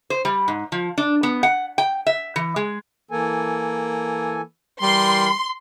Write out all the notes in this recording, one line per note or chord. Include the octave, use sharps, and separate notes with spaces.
C5
G3
G#2
F3
D4
B3
F#5
G5
E5
E3
G#3
E3 A#3 A4 G#5
E3 G3 A#4 C6